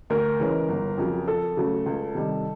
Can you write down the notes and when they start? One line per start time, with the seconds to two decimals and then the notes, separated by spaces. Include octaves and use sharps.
0.10 D2 A#4
0.40 C#3 E3 G#3 C#4
0.68 G1
0.98 F2 C#3 F#3
1.27 F2 A4
1.57 C#3 F#3 A3 C#4
1.86 C#2
2.15 C3 D#3 G3